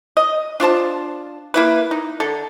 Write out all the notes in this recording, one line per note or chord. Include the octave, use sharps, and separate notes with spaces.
D#5
D4 F4 C5 A5
A#3 E4 B4
D#4
D3 A4